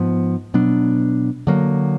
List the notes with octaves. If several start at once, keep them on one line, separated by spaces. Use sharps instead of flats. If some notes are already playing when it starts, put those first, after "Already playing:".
Already playing: G#2 F3 B3
B2 F#3 B3 D4
D3 F#3 A#3